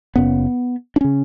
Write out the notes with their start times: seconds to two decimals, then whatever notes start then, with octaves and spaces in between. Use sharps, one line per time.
0.15 F#1 F#2 C#3 B3
0.96 D4
1.01 C#3 C#4